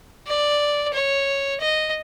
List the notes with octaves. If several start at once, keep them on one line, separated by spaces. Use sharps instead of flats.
D5
C#5
D#5